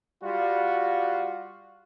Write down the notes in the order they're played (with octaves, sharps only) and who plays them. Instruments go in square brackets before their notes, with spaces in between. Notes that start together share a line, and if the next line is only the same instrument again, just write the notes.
[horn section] G3 F4 F#4